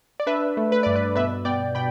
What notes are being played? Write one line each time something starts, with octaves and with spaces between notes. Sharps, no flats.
D5
D4 B4 E5
A3
B4
G2 D5
B4
B2 B4 E5
B3 D5 G5
B2 G5 B5